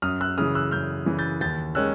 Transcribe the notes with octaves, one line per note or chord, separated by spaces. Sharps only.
F#2 D#6 F6
E6 F#6
C#3 E3 D#6 F6
E6 F#6
F#2 F6 G6
C#3 E3
G6 A6
D#2 G6 A6
D#3 G#3 C#4 E6 F#6